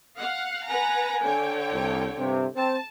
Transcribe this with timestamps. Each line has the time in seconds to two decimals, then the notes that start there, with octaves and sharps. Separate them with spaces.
0.19 F5 F#5
0.68 B4 F#5 G#5 A#5
1.24 D3 C#5 G5
1.72 C2
2.18 G2 C3
2.56 C4 A5